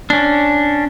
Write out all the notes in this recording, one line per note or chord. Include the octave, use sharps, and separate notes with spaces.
C#4 D4